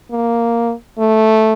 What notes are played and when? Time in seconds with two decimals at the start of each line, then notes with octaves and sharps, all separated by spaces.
0.11 A#3
0.99 A3